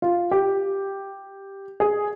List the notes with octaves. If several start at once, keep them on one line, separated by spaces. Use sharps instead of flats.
F4
G4
G#4